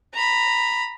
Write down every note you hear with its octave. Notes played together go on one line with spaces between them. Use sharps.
A#5 B5